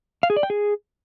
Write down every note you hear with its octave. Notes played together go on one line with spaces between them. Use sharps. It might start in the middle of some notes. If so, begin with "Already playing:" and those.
F5
G#4
D5
G5
G#4